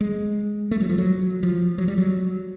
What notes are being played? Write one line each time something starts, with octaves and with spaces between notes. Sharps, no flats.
G#3
A3
F#3
F3
F#3
F3
F#3
G3
F#3